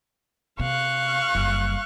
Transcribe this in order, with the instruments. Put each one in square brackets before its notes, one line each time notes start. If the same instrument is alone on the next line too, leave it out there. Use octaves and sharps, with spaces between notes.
[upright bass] C3 [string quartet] F5 C#6 F#6
[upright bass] F#1 G3